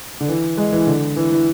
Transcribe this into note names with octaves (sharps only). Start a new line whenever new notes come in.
D3
E3
G#3
E3
D3
E3
E3